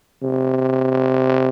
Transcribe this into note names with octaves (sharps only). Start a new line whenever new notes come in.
C3